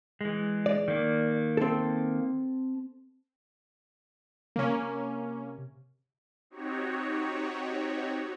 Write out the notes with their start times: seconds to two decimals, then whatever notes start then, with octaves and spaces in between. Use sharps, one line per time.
0.21 E3 G#3
0.66 D5
0.88 D#3 A#3
1.57 C4 A4
4.56 C3 A#3 C#4
6.50 C4 D#4 F#4 G4 C#5